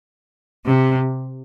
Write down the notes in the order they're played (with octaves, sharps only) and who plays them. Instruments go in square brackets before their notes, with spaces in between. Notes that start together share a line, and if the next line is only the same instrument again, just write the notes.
[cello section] C3